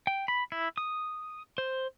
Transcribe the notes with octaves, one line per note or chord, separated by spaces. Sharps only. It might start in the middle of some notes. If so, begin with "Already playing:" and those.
G5
B5
E4
D#6
C5